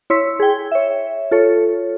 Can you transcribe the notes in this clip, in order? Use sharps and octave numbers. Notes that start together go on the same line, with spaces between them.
E4 C#5 C6 E6 B6
G#4 G5
C#5 E5
F4 A4 C#5